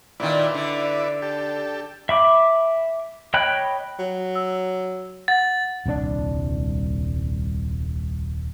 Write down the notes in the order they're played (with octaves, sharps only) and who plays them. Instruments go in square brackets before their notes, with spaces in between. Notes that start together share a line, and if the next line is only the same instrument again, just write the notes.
[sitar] A#2 D#3 [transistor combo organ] E4 B4 D5
[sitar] D3
[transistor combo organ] G4 A4
[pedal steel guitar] E5 B5 D6
C#5 D#5 G5 B5 F#6
[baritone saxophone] F#3
[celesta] E6
[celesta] F#5 [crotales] A6
[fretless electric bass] D#1 C2 A#2 D4